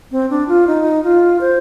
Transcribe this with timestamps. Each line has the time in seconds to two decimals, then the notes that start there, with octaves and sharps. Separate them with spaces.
0.12 C4
0.30 D4
0.48 F4
0.67 D#4
1.04 F4
1.41 C5